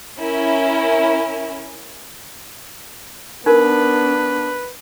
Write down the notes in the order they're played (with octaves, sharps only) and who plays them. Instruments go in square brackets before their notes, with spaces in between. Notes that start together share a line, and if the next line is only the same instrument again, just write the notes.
[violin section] C#4 E4 A#4
[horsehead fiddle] B3 D4 [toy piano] D#4 A#4 [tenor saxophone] B4